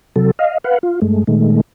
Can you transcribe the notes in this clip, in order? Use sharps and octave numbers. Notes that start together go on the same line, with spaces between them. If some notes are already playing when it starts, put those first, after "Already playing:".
C3 F#3 A4
D#5 F5
B4 F5 F#5
F4
G2 G#3 A3
A#2 D#3 G#3 A3